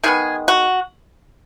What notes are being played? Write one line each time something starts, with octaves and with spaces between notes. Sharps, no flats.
D#3 G#3 B3 G#4
F#4